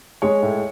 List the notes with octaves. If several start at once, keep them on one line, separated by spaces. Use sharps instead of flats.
G#3 C#5
A2